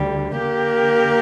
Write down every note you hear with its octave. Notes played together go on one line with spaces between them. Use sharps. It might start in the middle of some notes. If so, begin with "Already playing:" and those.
Already playing: D2 D3 G3
D3 A#3 G4 A#4